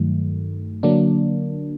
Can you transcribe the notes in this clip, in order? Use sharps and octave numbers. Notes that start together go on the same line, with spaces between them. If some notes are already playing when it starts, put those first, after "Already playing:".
Already playing: G2 D#3 F#3 A3
D3 F#3 A#3 D4